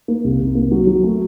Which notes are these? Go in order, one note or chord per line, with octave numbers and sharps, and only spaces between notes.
A#3
C2
C2
A#3
F#3
F#3
A3